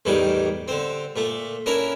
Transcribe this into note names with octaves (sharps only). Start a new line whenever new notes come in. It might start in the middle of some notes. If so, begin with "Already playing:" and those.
E2 A2 D#3 G3 D6
D3 C4
A#2 A3
C#4 D4 E4 A#4